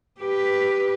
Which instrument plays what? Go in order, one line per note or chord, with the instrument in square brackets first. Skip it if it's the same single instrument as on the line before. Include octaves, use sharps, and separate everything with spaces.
[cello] G4 B4